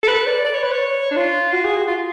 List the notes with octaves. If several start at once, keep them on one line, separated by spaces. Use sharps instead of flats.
A4
B4
D5
D5
C#5
B4
C#5
D4
F4
F#4
G#4
F#4
F4